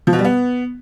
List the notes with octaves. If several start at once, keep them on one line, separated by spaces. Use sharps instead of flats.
F3
B2
G3
B3